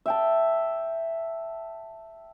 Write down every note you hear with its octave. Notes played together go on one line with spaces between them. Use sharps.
E5 G5 A5